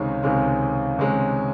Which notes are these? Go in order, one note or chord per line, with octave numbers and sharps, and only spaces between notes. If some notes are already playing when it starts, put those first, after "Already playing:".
Already playing: C#2 C3 D#3 G#3 C#4
C#2 C3 D#3 G#3 C#4
C#2 C3 D#3 G#3 C#4